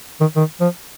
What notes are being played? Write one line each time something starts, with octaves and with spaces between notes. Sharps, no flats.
D#3
D#3
F3